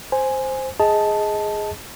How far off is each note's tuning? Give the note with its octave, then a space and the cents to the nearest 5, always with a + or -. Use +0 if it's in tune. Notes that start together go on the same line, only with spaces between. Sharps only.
C5 +0 G#5 +0
G#4 +5 D#5 +20 A5 -5